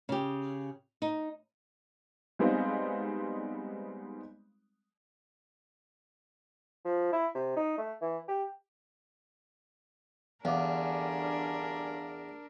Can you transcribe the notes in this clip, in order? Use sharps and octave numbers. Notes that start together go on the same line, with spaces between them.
C#3 G4
D#4
G3 G#3 B3 C4 D#4 F5
F3
E4
C3
D#4
A3
E3
G4
E2 D3 G3 C#4 D4 A#4 F5 D6